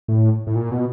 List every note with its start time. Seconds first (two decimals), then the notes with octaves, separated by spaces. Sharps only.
0.08 A2
0.47 A2
0.55 A#2
0.71 B2